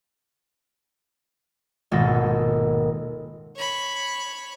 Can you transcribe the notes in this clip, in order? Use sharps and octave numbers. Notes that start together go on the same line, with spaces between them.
D#1 G#1 B2 A4 A#6
C#5 B5